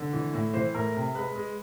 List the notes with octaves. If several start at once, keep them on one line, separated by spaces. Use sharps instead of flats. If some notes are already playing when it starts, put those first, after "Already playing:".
Already playing: D3
E3
A2
E3 C5
A2 A#4
C3
G#3 B4
G#3